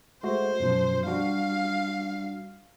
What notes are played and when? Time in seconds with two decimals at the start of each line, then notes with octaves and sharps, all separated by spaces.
0.23 G#3 A3 F#4 C5
0.60 F#2 B2 F3
1.05 G3 D4 F#4 F5